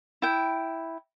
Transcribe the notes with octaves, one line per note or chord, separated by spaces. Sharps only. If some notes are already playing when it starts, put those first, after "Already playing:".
E4 G5